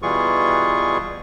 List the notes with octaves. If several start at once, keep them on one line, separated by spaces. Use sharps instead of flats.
B2 E3 G3 F4 G#4 C#6